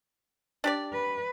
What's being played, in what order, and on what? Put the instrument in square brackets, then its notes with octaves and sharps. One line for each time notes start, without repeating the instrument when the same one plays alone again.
[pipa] D4 G4 D5
[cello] B4